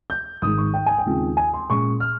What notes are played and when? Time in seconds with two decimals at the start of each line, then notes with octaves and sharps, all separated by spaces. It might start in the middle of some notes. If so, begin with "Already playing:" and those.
0.10 G6
0.42 G#1 G#2 D#3 G#3 D#6
0.58 C#6
0.74 G5
0.86 G#5
0.98 G5
1.06 D#2 C#3 G#3 C4 F4
1.37 G#5
1.53 C6
1.70 A#2 G#3 C#4 C#6
2.00 F6